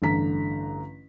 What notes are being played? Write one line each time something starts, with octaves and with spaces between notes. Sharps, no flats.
A1 G2 D3 D4 A#5 B6